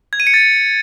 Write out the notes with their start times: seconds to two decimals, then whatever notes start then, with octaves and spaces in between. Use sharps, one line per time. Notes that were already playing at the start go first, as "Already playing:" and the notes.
0.13 G#6
0.20 D#7
0.27 C#7
0.34 A6